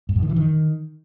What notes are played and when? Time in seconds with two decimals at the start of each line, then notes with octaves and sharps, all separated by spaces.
0.09 G2
0.16 F#2
0.23 D#3
0.29 E3
0.36 D#3